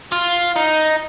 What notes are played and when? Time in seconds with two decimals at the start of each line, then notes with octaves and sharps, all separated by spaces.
0.12 F4
0.56 D#4